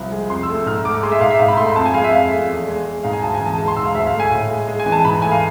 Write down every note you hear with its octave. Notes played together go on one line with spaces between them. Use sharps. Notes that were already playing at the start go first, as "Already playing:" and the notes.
Already playing: C2 F3
G#3
F2 C6
E6
A3
E6
G#2 F6
A3 D6
G#3 C6
E5
G#2 F5
E5
G#2 F5
B5
A3 C6
B5
F2 A5
G#5
G#3 F5
E5
F2 F5
A3
E2
G#3
G#3
G#2 F5
G#5
D2 A5
G#5
E3
A5
G#3 A5
C6
G#2 E6
F5
D2 E5
F5
A3
G#5
A2
G#3
G#3
G#5
E3
A5
G#2 B5
A3 G#5
F5